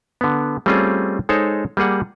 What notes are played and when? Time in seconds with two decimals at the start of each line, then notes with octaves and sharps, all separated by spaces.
0.21 D3 B3
0.66 G3 A3 C4 C#4 F4 G#4
1.29 G#3 D#4 A4 C5 C#5
1.77 G3 A#3 G#4 F#5